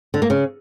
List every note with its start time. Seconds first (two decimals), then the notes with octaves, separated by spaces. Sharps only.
0.14 D3
0.22 A#3
0.30 C#3